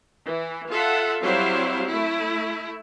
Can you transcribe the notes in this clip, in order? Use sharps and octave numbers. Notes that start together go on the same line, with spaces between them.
E3
F4 A4 E5 F#5
F#3 G3 C4 E4 C5 F5
A3 E4